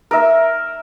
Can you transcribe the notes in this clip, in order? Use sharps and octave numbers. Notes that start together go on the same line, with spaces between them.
A#4 E5